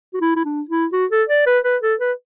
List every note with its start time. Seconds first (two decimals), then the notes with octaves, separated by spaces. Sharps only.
0.14 F#4
0.21 E4
0.36 E4
0.45 D4
0.69 E4
0.93 F#4
1.11 A4
1.29 D5
1.46 B4
1.64 B4
1.82 A4
2.00 B4